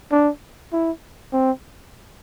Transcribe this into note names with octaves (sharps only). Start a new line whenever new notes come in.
D4
E4
C4